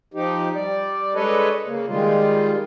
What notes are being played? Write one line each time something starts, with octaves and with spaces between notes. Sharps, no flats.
F3 D#4 G4
G3 D5
G#3 D4 A4 B4 C#5 D#5
C#3 A#3
D#3 G3 G#3 F4